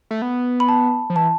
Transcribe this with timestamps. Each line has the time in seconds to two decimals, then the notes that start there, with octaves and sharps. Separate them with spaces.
0.11 A3
0.22 B3
0.60 B5
0.69 A5
1.10 F3
1.16 E3 A5